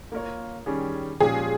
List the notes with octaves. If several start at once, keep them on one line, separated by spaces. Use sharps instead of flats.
A#3 F4 A#4 C#5
D#3 G3 C#4 G#4
A#2 F3 G#3 C#4 G4 G#4